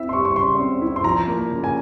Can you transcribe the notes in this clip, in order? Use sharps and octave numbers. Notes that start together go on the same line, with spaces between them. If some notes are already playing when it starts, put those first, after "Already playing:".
Already playing: C4 E4 E5
C6
G3 C#6
C#6
C#3 C6
C4
E4
C6
F3 A#5
A#3
C#3
G#5